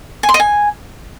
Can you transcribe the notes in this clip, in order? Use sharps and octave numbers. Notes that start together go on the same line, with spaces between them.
G#5
C6
D#5
G#5